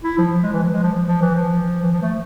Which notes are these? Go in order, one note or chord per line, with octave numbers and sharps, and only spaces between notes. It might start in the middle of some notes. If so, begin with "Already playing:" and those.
E4
F3
G#3
E3
F3
G#3
F3
F3
E3
F3
E3
F3
A3